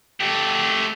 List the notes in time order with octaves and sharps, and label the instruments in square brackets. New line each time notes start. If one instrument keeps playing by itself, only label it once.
[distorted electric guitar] A3 G4